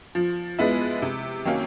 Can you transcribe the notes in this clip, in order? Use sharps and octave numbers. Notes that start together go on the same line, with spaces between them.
F3
G#3 B3 E4
C3
D#3 F#3 A#3 C#4